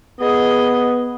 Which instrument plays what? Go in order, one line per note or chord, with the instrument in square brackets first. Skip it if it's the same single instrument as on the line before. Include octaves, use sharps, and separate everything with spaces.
[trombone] B3 [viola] G#4 D#5